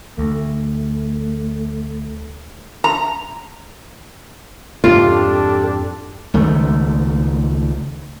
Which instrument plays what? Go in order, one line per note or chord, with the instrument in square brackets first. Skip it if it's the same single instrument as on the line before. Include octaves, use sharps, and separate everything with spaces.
[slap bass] D2 [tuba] A3
[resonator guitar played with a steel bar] A#5
[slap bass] F2 G#2 [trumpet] D4 [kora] F4 [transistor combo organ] G4 A4
[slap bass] C#2 D#3 A3